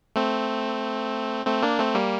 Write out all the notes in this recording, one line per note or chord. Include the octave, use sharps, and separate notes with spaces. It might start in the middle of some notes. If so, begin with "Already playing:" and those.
A3 C4
A3 C4
A#3 D4
A3 C4
G3 A#3